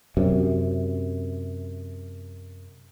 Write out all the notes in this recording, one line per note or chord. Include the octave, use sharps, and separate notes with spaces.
F#2 C3